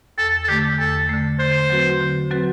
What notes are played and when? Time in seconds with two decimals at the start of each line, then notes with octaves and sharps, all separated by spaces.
0.18 E2 A4
0.44 A4
0.48 D3 A3 G4
0.78 E2 A4
1.09 D3 A3
1.39 D3 C5
1.70 F#3 C4 F#4 B4
2.00 D3
2.31 F#3 C4 F#4 B4